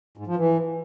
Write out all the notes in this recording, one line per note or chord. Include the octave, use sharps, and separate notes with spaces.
G#2
F3
E3